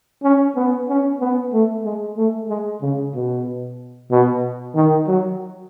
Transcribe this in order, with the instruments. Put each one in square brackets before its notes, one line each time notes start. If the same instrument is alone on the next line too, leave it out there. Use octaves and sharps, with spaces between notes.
[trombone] C#4
B3
C#4
B3
A3
G#3
A3
G#3
C#3
B2
B2
D#3
F#3